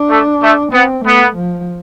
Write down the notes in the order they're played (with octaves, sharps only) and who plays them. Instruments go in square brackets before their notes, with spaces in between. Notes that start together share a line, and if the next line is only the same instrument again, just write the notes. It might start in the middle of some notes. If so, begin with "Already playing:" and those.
Already playing: [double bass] D4
[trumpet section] A3
A3
[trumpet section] B3 [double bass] C4
[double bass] A3 [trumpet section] B3
[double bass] F3